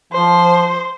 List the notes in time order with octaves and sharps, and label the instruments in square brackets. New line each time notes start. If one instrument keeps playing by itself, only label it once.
[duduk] F3 [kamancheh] C5